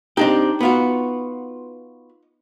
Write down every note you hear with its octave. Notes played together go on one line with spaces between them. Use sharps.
C4 D4 D#4 G4 D#5
B3 F4 F#4